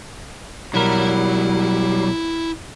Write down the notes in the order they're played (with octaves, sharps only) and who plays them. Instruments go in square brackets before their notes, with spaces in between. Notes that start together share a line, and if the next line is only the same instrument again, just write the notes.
[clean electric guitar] B1 A#4 [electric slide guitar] F#3 G3 [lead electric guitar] E4 B5